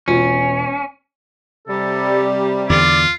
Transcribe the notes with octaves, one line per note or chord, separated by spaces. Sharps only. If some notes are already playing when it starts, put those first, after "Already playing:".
E1 C#4 F4 F#4
C3 G3 A4
E2 D3 F4 D5